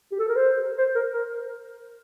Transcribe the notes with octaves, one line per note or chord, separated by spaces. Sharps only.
G4
A4
A#4
C5
C5
A#4
A#4